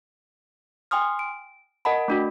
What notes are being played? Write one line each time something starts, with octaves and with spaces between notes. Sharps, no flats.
G5 G#5 C6 D#6 F6
D7
A#4 D#5 F#5 A5 B5
A3 D4 F#4